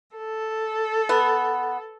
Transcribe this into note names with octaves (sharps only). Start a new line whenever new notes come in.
A4
B3